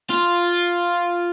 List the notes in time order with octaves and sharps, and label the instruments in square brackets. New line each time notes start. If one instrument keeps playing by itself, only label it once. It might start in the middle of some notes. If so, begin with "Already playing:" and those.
[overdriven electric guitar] F4